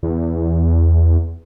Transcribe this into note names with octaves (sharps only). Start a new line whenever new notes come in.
E2